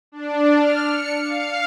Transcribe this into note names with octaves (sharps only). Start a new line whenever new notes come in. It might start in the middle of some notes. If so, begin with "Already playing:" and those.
D4
F6
C#7
F5